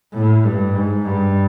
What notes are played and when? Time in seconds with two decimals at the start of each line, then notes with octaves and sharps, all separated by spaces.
0.14 A2
0.44 G2
0.75 G#2
1.05 G2